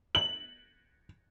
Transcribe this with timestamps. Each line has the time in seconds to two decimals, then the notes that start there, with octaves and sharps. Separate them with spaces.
0.15 F#7